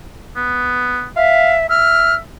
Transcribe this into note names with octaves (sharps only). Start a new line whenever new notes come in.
B3
E5 F5
E5 F6